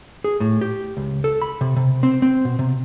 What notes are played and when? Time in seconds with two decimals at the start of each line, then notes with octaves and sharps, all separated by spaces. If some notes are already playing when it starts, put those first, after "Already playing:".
0.24 G#4
0.40 A2
0.61 G4
0.97 C#2
1.24 A4
1.42 B5
1.61 C3
1.76 C3
2.03 C4
2.22 C4
2.45 B2
2.59 C3